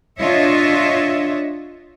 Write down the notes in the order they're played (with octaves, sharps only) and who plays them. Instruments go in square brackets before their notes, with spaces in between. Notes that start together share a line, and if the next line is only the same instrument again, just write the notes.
[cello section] D4 F4 C#5 D#5 E5